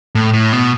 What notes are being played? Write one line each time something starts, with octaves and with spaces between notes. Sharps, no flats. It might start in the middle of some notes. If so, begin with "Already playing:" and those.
A2
A2
B2